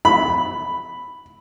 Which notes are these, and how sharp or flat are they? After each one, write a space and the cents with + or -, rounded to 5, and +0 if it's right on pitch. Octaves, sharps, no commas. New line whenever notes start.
B5 +0